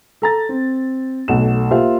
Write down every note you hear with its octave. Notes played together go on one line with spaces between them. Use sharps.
A4 A#5 A6
C4
B1 A3 F#5 E7
A#3 F4 G4 C5 E5 F5